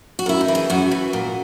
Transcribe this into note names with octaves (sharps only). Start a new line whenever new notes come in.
F#4
F#2 E4
D#4
E3
G#4
F#2 F#4
E3
A#2